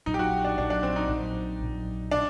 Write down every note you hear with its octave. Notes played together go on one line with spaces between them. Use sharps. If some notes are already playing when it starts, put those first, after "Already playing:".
A#1 A#2 F#3 D#4
G4
F#4
D4
A#1 A#2 F#3 D4
D4
C4
D#4
A#1 A#2 F#3
A#1 A#2 F#3
A#2 D4